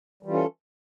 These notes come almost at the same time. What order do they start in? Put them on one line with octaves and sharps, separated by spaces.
G3 E3 F4 C#4 A4